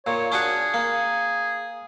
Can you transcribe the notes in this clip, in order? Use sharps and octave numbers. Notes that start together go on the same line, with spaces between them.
A#2 C#5
C#4 D4 F#4 G#4
A#3